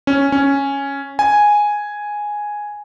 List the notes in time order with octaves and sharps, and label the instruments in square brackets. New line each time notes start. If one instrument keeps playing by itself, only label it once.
[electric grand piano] C#4
C#4
G#5